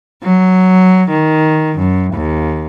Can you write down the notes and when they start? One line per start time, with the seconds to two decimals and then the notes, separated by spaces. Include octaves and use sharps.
0.22 F#3
1.09 D#3
1.78 F#2
2.13 D#2